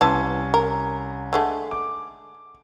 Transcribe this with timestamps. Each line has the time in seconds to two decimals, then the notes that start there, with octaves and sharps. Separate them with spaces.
0.01 C2 E3 B3 C#4 A5 C6
0.54 A#4
1.33 D3 G#3 A3
1.71 D6